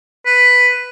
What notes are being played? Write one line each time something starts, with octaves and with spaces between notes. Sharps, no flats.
B4